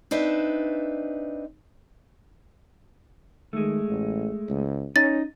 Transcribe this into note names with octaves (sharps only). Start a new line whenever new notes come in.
C4 D4 D#4 B4 E5
D#3 G#3 A3
A1
C#2
C#4 D#4 A6